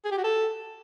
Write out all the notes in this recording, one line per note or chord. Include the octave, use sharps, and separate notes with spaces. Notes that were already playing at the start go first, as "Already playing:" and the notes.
G#4
G4
F#4
A4